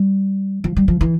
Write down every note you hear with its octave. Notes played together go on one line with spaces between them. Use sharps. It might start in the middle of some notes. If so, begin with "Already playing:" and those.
Already playing: G3
F3
G3
F3
E3